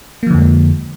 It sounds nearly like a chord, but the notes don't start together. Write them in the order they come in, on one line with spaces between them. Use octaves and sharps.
A#3 F3 D3 F2 G#3